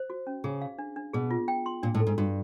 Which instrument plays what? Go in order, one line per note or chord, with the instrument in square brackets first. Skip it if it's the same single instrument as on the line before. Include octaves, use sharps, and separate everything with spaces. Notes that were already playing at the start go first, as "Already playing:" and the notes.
Already playing: [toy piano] C5
F#4
C#4
[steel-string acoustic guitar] C#3 [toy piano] G#4
[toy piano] F5
D4
D4
[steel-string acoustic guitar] B2 [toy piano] G#4
[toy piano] F4
G5
C6
[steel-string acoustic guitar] A#2 [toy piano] D4
[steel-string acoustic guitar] A2
[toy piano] A4
[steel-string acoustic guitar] G#2
[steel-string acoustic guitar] G2 [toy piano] F#4